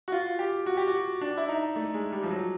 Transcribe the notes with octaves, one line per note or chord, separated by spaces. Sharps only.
F#4
F4
G4
F#4
G4
F#4
D4
E4
D#4
A3
G#3
G3
F3
F#3